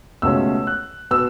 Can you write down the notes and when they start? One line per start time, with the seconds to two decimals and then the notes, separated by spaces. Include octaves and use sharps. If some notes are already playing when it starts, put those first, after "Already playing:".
0.22 C#2 B2 A3 C#4 E6
0.67 F#6
1.11 B2 B3 E6